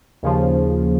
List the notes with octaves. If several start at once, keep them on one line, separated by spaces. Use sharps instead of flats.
D#2 C#3 F3